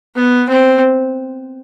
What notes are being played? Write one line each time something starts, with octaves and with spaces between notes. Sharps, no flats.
B3
C4